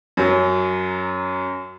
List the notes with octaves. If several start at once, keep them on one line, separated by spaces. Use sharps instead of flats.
F#2 F#3